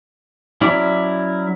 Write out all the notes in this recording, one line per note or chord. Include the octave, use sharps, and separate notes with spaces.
F#3 C#4 E4 D5